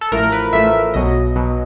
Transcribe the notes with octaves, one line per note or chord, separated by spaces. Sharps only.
A4
A1 A2 F3 A3 A#4
B4
A1 A2 F3 A3 E5
B1 B2 F#3 D#5
B1 B2 F#3